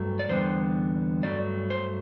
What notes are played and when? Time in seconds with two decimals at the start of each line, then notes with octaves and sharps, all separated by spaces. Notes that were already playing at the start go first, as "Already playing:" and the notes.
Already playing: G2 F#3 A3
0.19 D5
0.29 E2 D3 G3 B3 C5
1.23 G2 F#3 A3 D5
1.70 C5